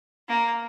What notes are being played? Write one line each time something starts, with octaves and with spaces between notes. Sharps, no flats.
A#3